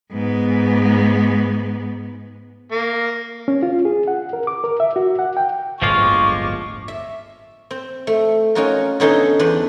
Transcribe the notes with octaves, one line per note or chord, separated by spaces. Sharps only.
G#2 B3
A#3
C#4
F4
G#4
F#5
A#4
D6
A#4
E5
F#4
F#5
G5
D1 G1 D3 F3 G#3 F4 C#6 D6
E5
C4
A3
C#4 D#4 F4 F#4 A#4
D3 B3 C#4 D#4 A4 C6
E2 D4 B4 C5